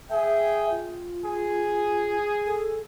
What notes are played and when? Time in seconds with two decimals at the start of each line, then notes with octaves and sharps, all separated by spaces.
0.10 G#4 E5 G5
0.70 F4
1.24 G#4
2.46 A4